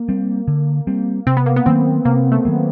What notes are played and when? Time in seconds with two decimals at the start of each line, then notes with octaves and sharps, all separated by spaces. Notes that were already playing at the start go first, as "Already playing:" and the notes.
Already playing: A#3
0.09 G3 C4
0.48 D3
0.87 G3 C4
1.27 C3 C4
1.37 B3
1.46 A#3
1.56 B3
1.66 D#3 F#3 A#3 C4
2.05 C3 A#3
2.32 A3
2.45 D#3 F#3 A#3